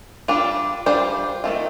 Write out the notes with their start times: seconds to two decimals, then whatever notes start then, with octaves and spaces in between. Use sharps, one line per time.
0.28 G3 D4 F4
0.86 G3 D4 F4 C5
1.44 D#3 A3 C4 F4